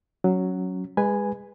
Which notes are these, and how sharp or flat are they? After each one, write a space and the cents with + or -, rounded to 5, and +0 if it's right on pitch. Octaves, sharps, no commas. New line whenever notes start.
F#3 +0 C#4 +0
G#3 -25 B4 +0 G#5 +0